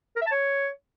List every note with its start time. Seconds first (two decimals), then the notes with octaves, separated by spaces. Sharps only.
0.16 A#4
0.22 E5
0.27 A5
0.32 C#5